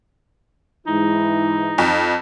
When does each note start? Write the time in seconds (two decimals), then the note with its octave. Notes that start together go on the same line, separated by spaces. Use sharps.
0.87 G#2 E3 D#4 E4
1.78 F2